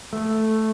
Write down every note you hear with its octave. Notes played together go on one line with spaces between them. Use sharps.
A3